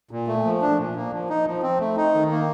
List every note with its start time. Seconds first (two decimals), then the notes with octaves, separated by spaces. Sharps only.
0.11 A#2
0.27 A3
0.44 F3
0.62 D4
0.79 A#2
0.95 A#3
1.13 F3
1.30 D#4
1.46 F3
1.62 C4
1.80 A3
1.97 D#4
2.14 D#3
2.30 A#3